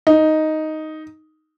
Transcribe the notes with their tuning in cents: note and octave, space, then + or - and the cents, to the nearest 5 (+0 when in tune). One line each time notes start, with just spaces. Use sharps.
D#4 +5